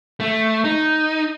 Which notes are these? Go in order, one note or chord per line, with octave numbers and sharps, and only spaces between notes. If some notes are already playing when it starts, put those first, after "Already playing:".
A3
D#4